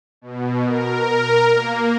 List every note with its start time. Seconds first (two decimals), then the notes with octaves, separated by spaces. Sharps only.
0.21 B2
0.64 A#4
1.54 A#3